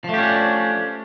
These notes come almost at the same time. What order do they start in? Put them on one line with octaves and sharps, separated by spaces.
F3 A3 G4 C#4 D4